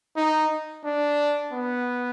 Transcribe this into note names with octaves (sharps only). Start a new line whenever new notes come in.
D#4
D4
B3